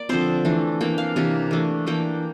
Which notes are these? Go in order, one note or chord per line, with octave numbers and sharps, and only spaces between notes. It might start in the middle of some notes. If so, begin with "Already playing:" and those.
Already playing: A#3 D5
D3 F3 C4 C5
E3 A3 D4
E3 A#3 D4 G5
F5
C3 E3 A#3 D4
E3 A3 D4
E3 A#3 D4 G5